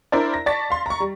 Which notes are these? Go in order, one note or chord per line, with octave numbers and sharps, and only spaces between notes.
D4 E4 A#4 C5 D5
A#6
D5 A5 C#6 A6 B6
F5 C6
A#5 C#6
G3